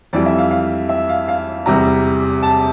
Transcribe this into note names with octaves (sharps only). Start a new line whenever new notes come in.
F2 E3 G3 D5
E5
F5
F5
E5
F5
F5
E2 C3 G3 A#5
A5